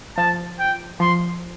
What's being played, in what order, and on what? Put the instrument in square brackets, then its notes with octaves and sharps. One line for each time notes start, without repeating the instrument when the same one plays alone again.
[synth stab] F3 [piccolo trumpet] A5
[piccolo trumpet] G5
[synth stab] F3 [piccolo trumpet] C6